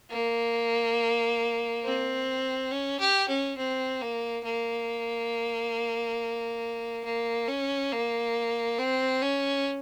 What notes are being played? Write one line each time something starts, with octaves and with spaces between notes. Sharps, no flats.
A#3
C4
C#4
G4
C#4
C4
A#3
A#3
A#3
C#4
A#3
C4
C#4